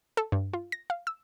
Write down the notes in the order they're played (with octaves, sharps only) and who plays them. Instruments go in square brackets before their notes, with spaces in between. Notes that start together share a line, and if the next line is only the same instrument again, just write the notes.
[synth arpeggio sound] A4
G2
F4
A#6
F5
E6